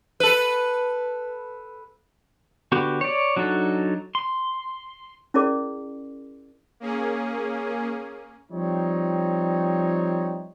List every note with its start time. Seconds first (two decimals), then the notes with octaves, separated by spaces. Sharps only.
0.20 A4 B4
2.72 D3 B3 F#4 G4
3.01 C#5 D5
3.37 F#3 D4 D#4 F#4 A4
4.15 C6
5.34 C#4 E4 G#4 A#4 D5 D6
6.80 A#3 C#4 G#4
8.51 F3 G3 C4 D#4 C#5